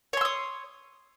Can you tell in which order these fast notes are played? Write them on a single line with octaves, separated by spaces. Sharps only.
C#5 C6 E6 D#6